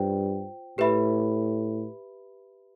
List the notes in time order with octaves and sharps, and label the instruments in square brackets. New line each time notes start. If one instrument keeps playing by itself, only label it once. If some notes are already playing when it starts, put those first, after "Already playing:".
Already playing: [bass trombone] G2 [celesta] F4 C5 G5
[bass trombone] A2 [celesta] G4 B4 E5 B5